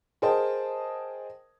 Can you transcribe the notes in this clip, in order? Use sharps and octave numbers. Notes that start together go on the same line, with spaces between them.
G#4 A#4 C5 D#5 G5 A5